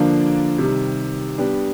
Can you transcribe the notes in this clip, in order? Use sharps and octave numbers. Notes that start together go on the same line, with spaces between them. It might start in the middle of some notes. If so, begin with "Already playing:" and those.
Already playing: D3 F3 A#3 D4
C3 D#3 G3
G3 B3 D4 G4